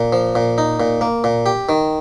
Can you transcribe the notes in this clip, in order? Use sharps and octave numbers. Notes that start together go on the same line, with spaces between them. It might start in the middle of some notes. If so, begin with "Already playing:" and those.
Already playing: A#2
F3
A#2
D#4
A#2
A#3
A#2
G4
D#3